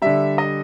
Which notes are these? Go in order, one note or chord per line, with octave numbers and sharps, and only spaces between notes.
D3 G3 E5
D#5